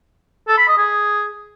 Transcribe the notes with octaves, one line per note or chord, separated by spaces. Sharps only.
A4
B5
D#5
G#4